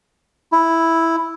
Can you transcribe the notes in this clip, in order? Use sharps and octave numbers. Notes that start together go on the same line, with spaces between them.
E4